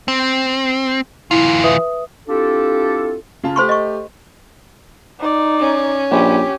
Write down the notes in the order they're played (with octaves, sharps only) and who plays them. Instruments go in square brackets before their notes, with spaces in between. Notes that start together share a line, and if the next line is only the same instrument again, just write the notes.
[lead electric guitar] C4
[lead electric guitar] E3 F4 [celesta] E4
[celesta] B4 E5 D#6
[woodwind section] C4 D4 E4 F4 G4 A4
[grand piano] C#3 F4 A5
[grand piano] A3 G4 [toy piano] C5 C6 C#6
[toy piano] D#5 C#6
[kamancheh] D#4 D5
[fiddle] C#4
[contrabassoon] A#1 [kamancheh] G4